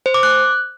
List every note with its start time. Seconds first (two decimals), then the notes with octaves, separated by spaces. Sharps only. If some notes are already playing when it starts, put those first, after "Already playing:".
0.06 C5
0.14 D6
0.23 F#6